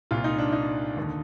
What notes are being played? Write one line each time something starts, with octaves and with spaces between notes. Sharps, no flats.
C2 A#2 F4
D#4
D4
D#4
D#2 D3